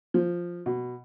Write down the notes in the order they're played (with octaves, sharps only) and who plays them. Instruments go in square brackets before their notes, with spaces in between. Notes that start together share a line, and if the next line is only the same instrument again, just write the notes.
[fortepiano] F3
B2